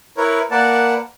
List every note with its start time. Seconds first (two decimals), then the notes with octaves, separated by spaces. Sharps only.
0.17 E4 A#4 B4 C#5
0.51 A#3 A#4 B4 D5 F#5 A5